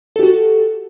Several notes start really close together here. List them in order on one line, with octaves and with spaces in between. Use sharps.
A4 G4 F#4